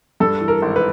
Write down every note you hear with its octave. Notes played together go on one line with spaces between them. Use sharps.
G2 A4
E3
A#4
G#1
B4